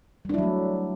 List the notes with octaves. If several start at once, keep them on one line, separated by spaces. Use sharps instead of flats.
F#3 G3 A3 D4 E4